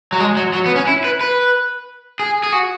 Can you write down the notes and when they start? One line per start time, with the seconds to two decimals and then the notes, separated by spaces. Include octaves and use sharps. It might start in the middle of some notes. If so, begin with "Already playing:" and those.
0.12 F#3
0.20 G#3
0.37 F#3
0.53 F#3
0.66 B3
0.76 C#4
0.87 E4
1.04 B4
1.21 B4
2.20 G#4
2.43 G#4
2.53 F#4